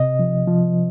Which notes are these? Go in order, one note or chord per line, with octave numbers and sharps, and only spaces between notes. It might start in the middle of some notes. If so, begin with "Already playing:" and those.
Already playing: C3 D#5
F3
F3